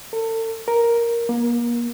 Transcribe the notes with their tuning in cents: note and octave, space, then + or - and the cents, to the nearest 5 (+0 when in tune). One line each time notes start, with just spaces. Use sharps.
A4 +40
A#4 +5
A#3 +35